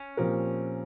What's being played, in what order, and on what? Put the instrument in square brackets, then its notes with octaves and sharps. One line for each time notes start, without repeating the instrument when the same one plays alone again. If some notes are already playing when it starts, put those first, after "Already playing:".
Already playing: [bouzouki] C#4
[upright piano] A#2 F3 C4 G4 A#4